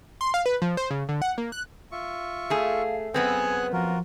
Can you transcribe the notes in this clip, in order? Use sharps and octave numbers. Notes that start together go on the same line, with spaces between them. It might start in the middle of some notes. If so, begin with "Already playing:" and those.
C6
F5
B4
F3
C5
C#3
D3
F#5
A#3
F#6
F4 E5 C#6
A3 G#4 F5
F#2 B3 C4 G#4 B4 F#5 G#5
F3 F4 F#4 A#4